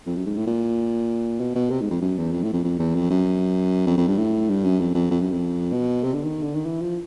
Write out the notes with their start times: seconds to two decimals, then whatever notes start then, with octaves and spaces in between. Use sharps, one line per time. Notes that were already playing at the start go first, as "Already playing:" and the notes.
0.06 F2
0.16 F#2
0.26 G#2
0.37 A2
0.47 A#2
1.40 B2
1.55 B2
1.70 C3
1.81 G#2
1.91 F2
2.01 F#2
2.18 E2
2.32 F2
2.43 A2
2.53 F2
2.64 F2
2.79 E2
2.95 F2
3.10 F#2
3.87 F2
3.98 F2
4.08 G2
4.18 A2
4.49 G2
4.64 F#2
4.80 F2
4.95 F2
5.11 F2
5.21 F#2
5.32 F2
5.73 B2
6.04 C3
6.14 D3
6.24 D#3
6.43 D3
6.55 D#3
6.66 E3
6.81 F3